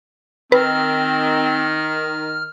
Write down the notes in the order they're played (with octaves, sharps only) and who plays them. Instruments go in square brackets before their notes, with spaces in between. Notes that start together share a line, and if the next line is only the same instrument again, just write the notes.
[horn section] D#3 [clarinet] C4 [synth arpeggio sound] B4 [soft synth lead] F6